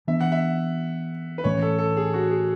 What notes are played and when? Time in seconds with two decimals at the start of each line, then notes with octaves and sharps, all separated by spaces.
0.07 E3 B3 D4 E5
0.20 F#5
0.32 E5
1.38 B4
1.44 A2 E3 A3 C#4 C#5
1.62 A4
1.79 A4
1.97 G#4
2.14 F#4
2.30 G#4